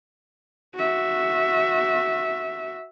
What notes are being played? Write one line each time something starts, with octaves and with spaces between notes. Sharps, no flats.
F#4 E5